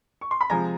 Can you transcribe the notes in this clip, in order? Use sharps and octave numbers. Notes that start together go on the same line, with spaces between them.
C#6
C6
B5
C3 F3 G#3 G#5 A#5